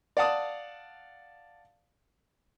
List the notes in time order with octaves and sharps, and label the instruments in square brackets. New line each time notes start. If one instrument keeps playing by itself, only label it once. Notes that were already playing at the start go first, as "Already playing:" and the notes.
[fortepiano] D5 F5 F#5 A5 D#6